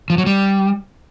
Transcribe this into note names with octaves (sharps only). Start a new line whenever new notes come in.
F3
F#3
G3